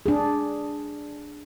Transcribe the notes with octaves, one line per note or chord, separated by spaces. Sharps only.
D4 G#4